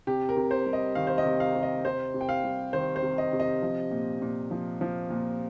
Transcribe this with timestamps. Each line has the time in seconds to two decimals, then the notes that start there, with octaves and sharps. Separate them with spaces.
0.07 C3 G4
0.29 A#4
0.37 C3
0.51 C5
0.66 G3
0.73 D#5
0.95 D#3 F5
1.07 C5
1.18 D#5
1.25 C3
1.40 F5
1.55 C3
1.63 D#5
1.84 C3 C5
2.14 C3
2.21 G5
2.29 F5
2.44 G3
2.73 D#3 C5
2.96 C5
3.02 C3
3.18 D#5
3.33 C3
3.40 D#5
3.62 F3
3.91 A#2
4.22 A#2
4.51 F3
4.81 F3
5.10 A#2